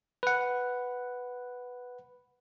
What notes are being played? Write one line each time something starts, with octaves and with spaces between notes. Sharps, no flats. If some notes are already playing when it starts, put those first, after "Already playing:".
B4 F#5